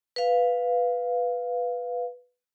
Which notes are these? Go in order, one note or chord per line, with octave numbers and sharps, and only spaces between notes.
B4 F5